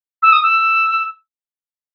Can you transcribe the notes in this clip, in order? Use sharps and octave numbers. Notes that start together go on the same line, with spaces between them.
E6
D#6
E6